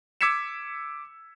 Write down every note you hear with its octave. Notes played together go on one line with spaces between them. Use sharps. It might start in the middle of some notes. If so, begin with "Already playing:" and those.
D6 E6 G#6 B6 C#7 E7